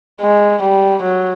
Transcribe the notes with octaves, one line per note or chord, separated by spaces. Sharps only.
G#3
G3
F#3